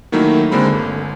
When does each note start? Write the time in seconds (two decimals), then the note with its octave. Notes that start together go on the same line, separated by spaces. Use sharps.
0.12 D#3 F#3 A3 A#3 D#4 E4
0.51 D3 G#3 A#3 C4 B5
0.73 G1